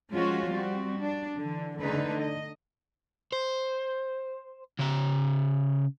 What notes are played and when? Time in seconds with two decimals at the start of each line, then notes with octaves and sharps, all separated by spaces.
0.10 F3 G#3 C#4 F4 F#4
0.51 G3 C4 F#4
0.99 D4
1.38 D3 E3
1.80 D3 A3 D#4 B4
2.20 D#5
3.33 C5
4.79 C#3 E5